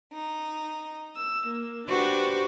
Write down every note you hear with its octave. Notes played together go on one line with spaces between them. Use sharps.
D#4
E6
A#3
D4 F#4 G4 B4 C5